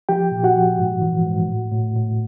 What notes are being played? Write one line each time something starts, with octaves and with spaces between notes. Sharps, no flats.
F3 G4 G5
A#2
F#4 F#5
F3
G#2
E3
G#2
A2
A2
A2